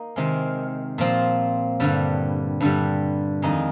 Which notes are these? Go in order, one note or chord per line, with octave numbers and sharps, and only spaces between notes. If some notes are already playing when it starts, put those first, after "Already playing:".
Already playing: A#3 D#4
C3 D#3 G#3 C4
A#2 F3 C4
G2 D3 G3
G2 D3 G3
F2 D#3 G#3 D#4